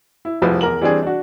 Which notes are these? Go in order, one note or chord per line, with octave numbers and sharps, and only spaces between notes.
E4
F1 C2 F3 G#4 B4
E2 A#4 F#7
E3 G3 C4 D4 G#4
D4 F#4